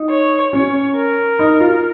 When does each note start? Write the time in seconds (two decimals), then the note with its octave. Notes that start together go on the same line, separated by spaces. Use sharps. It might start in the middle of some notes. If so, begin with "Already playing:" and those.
Already playing: D#4
0.10 C#5
0.53 C#4 C#5
0.96 A#4
1.39 D#4
1.60 F4